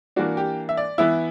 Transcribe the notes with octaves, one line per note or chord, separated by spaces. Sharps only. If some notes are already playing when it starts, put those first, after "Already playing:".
E3 A#3 D4 F#4
G4
E5
D5
E3 B3 E4 E5